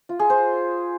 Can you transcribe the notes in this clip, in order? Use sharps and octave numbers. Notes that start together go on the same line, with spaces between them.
F4
G#4
C5